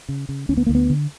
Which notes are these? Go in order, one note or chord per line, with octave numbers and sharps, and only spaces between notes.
C#3
C#3
D2 C#4
B3
D2 A#3
B3
D3